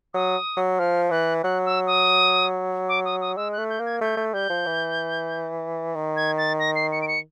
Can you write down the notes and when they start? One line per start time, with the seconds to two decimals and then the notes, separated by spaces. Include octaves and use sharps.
0.14 F#3 D#6
0.57 F#3
0.79 F3 F6
1.11 E3 F#6
1.43 F#3 F#6
1.65 E6
1.87 D#6
2.89 D6
3.05 D#6
3.21 D#6
3.37 G#3 E6
3.53 F#6
3.58 A3
3.69 G6
3.79 A#3
3.85 G#6
4.01 A3 G6
4.17 A3
4.33 G3 G6
4.50 F3
4.66 E3
5.95 D#3
6.16 G#6
6.38 A6
6.60 A#6
6.75 C7
6.92 C#7
7.02 D7
7.08 C#7